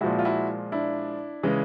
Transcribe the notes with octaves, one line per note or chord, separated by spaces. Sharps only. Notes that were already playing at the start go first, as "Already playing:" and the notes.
A#2 F3 G#3 E4 F#4
F4
E4 F#4
D4 E4
C#3 E3 G#3